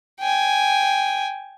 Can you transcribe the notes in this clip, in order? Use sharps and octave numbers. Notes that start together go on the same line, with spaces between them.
G5 G#5